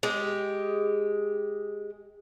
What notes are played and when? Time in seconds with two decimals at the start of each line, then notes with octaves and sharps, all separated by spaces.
0.03 G#3 G4